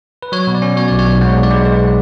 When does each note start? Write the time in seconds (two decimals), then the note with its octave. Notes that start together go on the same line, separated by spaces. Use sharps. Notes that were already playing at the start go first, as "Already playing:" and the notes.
0.23 B4
0.32 F#3 C#5
0.47 B2
0.55 D5
0.62 C#4
0.77 B2 C#5
0.88 B1 D5
0.99 C#5
1.06 B1
1.21 G#3 F#5
1.32 D5
1.36 B1
1.43 D5
1.51 G#3 C#5
1.65 G#3 B4